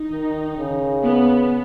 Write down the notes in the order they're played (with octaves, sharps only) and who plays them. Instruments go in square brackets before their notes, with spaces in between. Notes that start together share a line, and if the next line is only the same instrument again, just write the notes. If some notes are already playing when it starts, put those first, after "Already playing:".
Already playing: [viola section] D#4
[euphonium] D#3
C#3
[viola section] B3